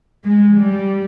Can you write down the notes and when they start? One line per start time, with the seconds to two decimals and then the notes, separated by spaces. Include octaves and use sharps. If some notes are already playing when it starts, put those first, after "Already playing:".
0.25 G#3
0.57 G3